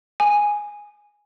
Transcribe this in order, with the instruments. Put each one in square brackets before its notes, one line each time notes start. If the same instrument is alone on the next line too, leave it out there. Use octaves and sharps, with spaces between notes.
[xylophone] G#5